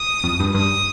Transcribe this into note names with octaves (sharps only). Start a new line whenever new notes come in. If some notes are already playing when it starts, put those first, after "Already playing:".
Already playing: D#6
F2
G2
G2 D#6